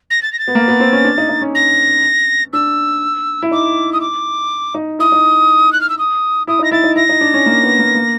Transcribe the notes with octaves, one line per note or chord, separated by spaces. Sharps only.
A#6
A6
A#6
A6
B3
A#3
B3
C4
C#4
D4
D#4
D#4
C#4
A#6
D4 E6
E4
D#4 D6
D#6
D6
D#4
E4 D#6
D#4
F#6
F6
E6
D#6
E4 D#6
D#4
A#6
E4 A6
D#4
E4 A#6
D#4
D4
C#4
A#3
B3
A#3
A#3